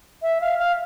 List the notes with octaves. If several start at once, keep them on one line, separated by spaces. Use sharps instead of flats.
E5
F5
F5